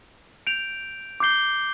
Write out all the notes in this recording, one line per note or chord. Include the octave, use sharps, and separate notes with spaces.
G6 D7 F7
D6 G6 C7 G7